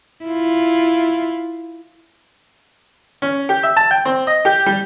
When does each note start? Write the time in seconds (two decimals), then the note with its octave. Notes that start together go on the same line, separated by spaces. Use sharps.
0.25 E4 F4
3.22 C#4
3.49 G4
3.63 E5
3.77 A5
3.91 G5
4.05 C4
4.27 D#5
4.45 G4
4.66 G3